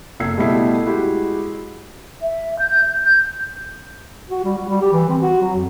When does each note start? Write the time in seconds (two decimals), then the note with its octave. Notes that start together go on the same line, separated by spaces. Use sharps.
0.20 F#1 A4 E6 G#6 C7
0.38 B2 G3 A3 E4 E5 C7
0.86 G#3 E4 F#4 G4
2.21 E5
2.58 G6
3.04 G6
4.30 F#4
4.45 G3
4.57 F#4
4.69 G3
4.81 G4
4.93 E3
5.10 C4
5.22 F#4
5.41 F#3
5.55 F2